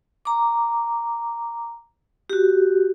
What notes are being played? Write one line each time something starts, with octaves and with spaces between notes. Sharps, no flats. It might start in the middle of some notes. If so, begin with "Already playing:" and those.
A#5 D6
F#4 G4